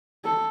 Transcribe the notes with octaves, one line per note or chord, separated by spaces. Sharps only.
A4